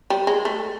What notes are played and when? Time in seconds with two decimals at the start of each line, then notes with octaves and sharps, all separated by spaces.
0.10 G3
0.27 G#3
0.45 A3